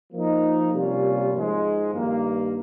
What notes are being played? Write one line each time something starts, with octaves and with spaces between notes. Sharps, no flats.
F3 A#3 D#4
C3 G3 A#3 C#4 F4
G#2 F3 G#3
G2 D#3 A#3